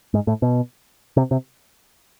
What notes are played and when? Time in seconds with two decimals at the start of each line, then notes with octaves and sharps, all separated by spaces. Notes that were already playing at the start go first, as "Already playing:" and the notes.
0.14 G#2
0.27 A2
0.42 B2
1.17 C3
1.31 C3